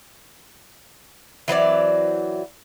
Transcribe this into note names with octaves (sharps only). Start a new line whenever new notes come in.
E3 F#3 C4 D5